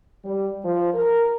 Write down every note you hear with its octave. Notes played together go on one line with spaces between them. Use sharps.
G3
F3
A#4